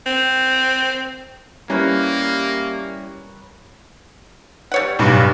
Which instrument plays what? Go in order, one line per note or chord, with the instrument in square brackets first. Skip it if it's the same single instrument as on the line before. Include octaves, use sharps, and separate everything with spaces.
[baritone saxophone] C4
[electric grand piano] G3 C#4 E4 [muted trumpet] A#3 [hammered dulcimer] A#4 B4 C#5
[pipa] G3 C#5 F#5
[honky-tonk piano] B1 G2